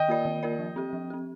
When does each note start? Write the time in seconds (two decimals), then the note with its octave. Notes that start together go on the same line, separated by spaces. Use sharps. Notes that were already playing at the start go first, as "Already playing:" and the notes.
Already playing: D#3 D#5 G5
0.08 A#3 F4 A#4 D5
0.25 D#3
0.43 A#3 F4 A#4 D5
0.59 F3
0.76 C4 G4
0.93 F3
1.10 C4 G4